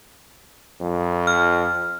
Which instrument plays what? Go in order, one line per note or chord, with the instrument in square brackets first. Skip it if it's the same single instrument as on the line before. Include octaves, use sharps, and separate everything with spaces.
[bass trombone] F2
[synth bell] F6